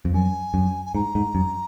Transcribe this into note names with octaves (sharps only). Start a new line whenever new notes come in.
F2
F#2 G#5
F#2
G#5
G#2 A#5
G#2
F#2